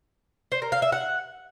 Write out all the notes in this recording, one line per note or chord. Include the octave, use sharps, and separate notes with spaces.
C5
A#4
F5
E5
F#5